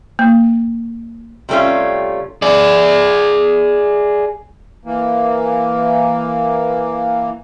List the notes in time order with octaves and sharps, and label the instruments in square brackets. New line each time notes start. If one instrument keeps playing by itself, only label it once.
[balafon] A#3
[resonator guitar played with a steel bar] C3 G3 A3 C#4 F4
[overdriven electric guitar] G#4 D5
[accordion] E3 A#3